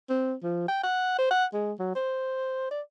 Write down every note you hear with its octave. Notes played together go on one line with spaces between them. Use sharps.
C4
F3
G5
F#5
C5
F#5
G#3
F#3
C5
D5